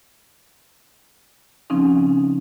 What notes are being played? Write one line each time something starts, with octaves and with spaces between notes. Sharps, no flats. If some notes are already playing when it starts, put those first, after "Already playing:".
C#3 F3 C4 C#4 D#4